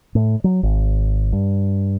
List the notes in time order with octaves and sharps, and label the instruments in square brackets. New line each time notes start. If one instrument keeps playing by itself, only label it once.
[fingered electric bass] A2
F#3
G#1
G2